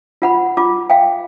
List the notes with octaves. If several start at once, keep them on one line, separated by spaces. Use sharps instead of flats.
F4 F#5 B5
F4 D6
F5 G5